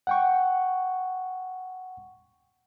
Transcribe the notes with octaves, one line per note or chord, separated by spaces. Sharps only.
F#5 G5 C#6